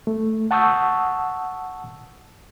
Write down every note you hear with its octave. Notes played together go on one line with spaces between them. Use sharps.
A3
F#5 A5 C#6 D#6 E6 G6